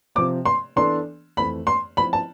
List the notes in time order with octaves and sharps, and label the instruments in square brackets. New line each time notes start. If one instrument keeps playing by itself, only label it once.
[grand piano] C3 F3 C4 [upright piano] D6
[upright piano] C6
[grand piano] E3 B3 D4 A4 D5 [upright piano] C6
[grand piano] F2 E3 A3 C4 [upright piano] B5
[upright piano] C6
[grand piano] F3 C4 E4 [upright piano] B5
[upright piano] A5